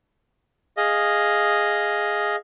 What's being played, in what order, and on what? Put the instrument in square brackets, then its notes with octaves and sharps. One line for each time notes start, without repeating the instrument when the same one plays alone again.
[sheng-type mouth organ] G#4 D#5 F5